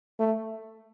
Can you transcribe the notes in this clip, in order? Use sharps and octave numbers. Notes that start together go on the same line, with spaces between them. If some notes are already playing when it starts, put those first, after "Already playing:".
A3